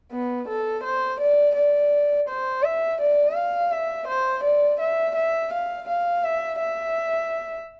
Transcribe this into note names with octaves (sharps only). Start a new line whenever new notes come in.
B3
A4
C5
D5
D5
C5
E5
D5
F5
E5
C5
D5
E5
E5
F5
F5
E5
E5